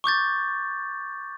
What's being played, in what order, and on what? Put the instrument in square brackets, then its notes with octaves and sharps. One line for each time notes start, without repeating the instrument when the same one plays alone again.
[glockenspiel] C#6 D6 G6 A6